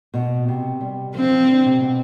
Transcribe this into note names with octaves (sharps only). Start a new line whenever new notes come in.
B2
C3
G3
F3 C4
F3
D3
C3
B2